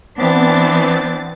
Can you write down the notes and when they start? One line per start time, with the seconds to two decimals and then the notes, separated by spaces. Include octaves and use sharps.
0.18 E3 B3 C4 D4 A6